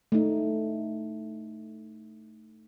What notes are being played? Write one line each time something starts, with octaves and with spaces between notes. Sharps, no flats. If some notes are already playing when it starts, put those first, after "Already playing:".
A3 D#4